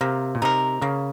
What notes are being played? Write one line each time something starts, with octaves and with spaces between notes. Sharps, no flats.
C3 A#3
A#2
C3 D#4 A#4
C#3 A#3